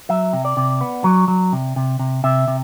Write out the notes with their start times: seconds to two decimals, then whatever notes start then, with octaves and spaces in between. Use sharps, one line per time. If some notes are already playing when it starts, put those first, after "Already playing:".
0.09 F#3 E5
0.33 C3
0.45 D5
0.57 C3
0.81 B3
1.04 F#3
1.28 F#3
1.53 C3
1.76 C3
1.99 C3
2.24 C3 E5
2.48 C3